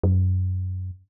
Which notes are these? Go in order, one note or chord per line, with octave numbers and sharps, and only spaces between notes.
F#2